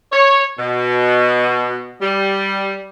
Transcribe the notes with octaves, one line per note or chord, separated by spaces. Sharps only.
C#5
B2
G3